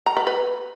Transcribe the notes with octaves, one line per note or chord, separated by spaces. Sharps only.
A#5
B4
B4